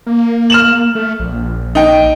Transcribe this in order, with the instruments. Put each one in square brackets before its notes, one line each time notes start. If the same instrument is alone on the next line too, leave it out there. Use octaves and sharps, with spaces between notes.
[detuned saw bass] A#3
[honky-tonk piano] F6 E7 F#7
[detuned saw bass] A3
A#1
[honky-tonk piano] D#4 G5